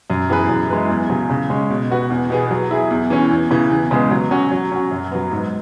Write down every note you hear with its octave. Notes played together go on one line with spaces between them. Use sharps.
F#2
E3 B3 G#4 B4
F#2
E3 G#3 E4 B4
E2
C#3 F#3 C#4
C#3
G#3 C#4
B2
B3 F#4 B4
E2
B2 B3 G#4
F#3
E4 G#4
E2
E3 C#4
E2
C#3 E3
E2
C#3 G#3 B3
F#3
C#4 F#4
F#3
C#4 F#4
F#2
F#3 B3
G#2